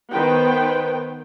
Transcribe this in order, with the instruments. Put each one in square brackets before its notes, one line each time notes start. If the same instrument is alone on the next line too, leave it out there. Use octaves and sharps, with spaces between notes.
[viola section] D#3 B3 B4 C5 G5